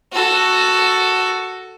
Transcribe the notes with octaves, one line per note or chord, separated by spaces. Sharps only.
F#4 A4